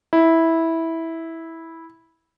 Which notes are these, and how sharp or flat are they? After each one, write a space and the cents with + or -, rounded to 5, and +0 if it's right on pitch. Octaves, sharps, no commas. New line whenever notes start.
E4 -10